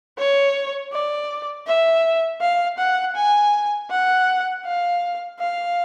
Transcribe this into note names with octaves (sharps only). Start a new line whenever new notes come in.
C#5
D5
E5
F5
F#5
G#5
F#5
F5
F5